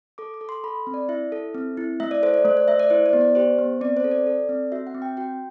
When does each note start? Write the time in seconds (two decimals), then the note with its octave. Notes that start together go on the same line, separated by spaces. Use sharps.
0.18 A4 D6
0.34 D6
0.41 A4
0.49 C6
0.64 A4 B5
0.87 C4
0.94 D5
1.09 E4 E5
1.32 A4
1.55 C4
1.77 E4
2.00 A3 E5
2.11 D5
2.22 A4 C5
2.34 D5
2.45 A3 C5
2.57 D5
2.68 A3 E5
2.79 D5
2.90 E4 C5
3.06 D5
3.13 B3
3.21 D5
3.35 G4 C5
3.59 B3
3.81 C4 D5
3.97 C5
4.04 A4
4.11 D5
4.27 A4
4.49 C4
4.72 F#4 E5
4.87 F#5
4.94 C4
5.02 G5
5.17 F#4 G5